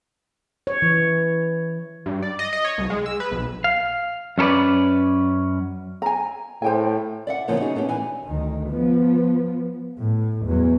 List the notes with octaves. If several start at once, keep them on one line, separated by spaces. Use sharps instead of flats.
C#5
E3
G2
D5
D#5
D#5
C#5
C2
G#3
E6
B4
B1
F5
F#2 C#4 A4 B4 D5
G#5 A#5
A2 C5 G5 G#5
D5 E5 F#5
C#3 E3 F3 A#3 B3
C#4 D#4 F#4 G#4
A3 B3 C#4 G4
A#2 E3 D4 G#5
D2 D#3
F3 B3
A2
E2 F#3